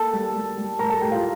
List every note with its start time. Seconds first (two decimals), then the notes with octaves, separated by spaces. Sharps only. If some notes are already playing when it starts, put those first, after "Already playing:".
Already playing: A#3 A4 A5
0.13 G3
0.36 G3
0.57 G3
0.79 A2 A#4 A#5
0.90 A4 A5
1.01 A2 G4 G5
1.12 F4 F5